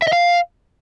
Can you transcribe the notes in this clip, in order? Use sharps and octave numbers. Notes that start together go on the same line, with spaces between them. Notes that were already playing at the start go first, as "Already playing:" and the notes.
E5
D#5
F5